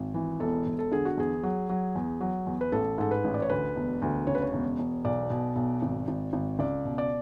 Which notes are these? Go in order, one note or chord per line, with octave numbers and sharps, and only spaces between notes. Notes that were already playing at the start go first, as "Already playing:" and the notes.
Already playing: G#1
E3
E1 A4
E1
A4
D3 G#4
F#4
E2 G#4
F#3
F#3
E2
F#3
E2
B4
A1 A4
G#2 A4
B4
A1
D5
C#5
D2 B4
E1
D2
C#3 C#5
B4
C#5
E1
E1
B1 D5
B2
B1
G#1
G#1
G#1
C#2 D5
B2
D5